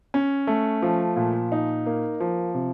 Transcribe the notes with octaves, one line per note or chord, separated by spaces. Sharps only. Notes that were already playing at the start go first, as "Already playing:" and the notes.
C#4
A3
F3
A#2
D#4
A#3
F3
C3